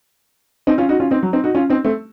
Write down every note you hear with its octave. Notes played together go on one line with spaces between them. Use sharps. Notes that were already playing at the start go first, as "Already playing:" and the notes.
C4 D#4
C#4 F4
D#4 F#4
C#4 F4
C4 D#4
F#3
C4 D#4
D#4 F#4
C#4 F4
C4 D#4
A3 C4